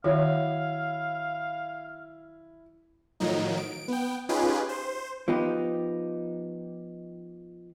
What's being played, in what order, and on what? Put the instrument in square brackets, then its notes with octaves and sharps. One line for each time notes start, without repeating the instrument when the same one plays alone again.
[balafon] D#3 [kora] F#3 [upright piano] E4 [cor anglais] F5
[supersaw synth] A2 D#3 F3 F#3 D#4
D7
B3 G5
C#4 D#4 F4 G4 G#4 B4
C5
[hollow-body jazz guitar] F3 B3 D#4 G4